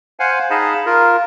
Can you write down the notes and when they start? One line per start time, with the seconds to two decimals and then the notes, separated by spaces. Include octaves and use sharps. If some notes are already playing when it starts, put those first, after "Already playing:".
0.20 C5 F5 F#5 G#5
0.50 D#4 G#4 D#5 F5 A5 B5
0.86 F4 A#4